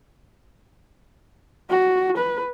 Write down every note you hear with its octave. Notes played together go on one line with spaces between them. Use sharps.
F#4
B4